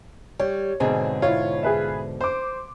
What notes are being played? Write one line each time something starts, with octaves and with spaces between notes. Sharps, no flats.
G3 C#5
G#2 B2 D3 C4 G#4
E4 F4 C#5
G#4 B4 E5
C5 C6 D6